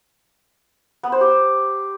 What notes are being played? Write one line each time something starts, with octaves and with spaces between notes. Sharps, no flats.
B3
C5
G4